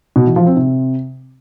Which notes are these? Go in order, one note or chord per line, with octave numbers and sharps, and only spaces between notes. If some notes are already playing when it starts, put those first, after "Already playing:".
B2
E3
F3
C4
C3